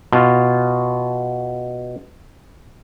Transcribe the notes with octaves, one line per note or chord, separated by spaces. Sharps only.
B2 F4